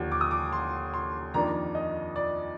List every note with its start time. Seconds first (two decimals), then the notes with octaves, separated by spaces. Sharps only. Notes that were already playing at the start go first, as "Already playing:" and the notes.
Already playing: D#2 D3 F3
0.12 D6
0.21 D#6
0.31 D6
0.53 C6
0.94 C6
1.34 F2 D#3 A#3 D4 A#5
1.75 D#5
2.16 D5